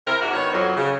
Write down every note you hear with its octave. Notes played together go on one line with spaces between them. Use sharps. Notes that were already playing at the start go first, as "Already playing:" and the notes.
C3 E4 A#4
G#2 D4 F#4
D#3 B3 C#5
F2 F#3
C#3